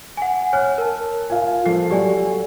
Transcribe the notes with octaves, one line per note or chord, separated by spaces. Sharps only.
F#5 G#5
C#5 G#5 F6 F#6
A#4 A5
F4 F5 G#5
F3 A4 C7
F#3 F#4 G4 D5 G#5